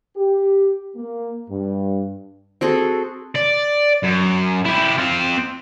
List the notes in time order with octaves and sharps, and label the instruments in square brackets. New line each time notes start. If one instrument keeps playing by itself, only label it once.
[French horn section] G4
A#3
G2
[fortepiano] C4 [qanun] F#4 G#4 A4
[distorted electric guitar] D5
F#2
E4 G4
C4 F4